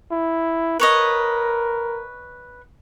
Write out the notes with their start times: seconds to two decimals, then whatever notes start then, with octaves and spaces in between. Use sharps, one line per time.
0.11 E4
0.80 A#4 B4 C#5 D#5